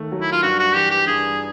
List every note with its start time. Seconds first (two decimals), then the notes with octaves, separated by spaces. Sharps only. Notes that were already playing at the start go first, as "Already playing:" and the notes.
Already playing: D#2 D#3 A3
0.12 F#3
0.21 E4
0.32 F4
0.43 G2 F#4
0.59 F#4
0.75 E3 G4
0.91 G4
1.07 G2 G#4